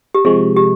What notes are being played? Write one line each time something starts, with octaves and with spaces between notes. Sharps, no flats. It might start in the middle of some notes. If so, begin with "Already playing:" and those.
G4
C3 F3 G#3 G#4
G4